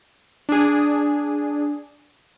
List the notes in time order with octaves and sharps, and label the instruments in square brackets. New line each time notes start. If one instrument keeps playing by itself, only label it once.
[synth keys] D4 G#4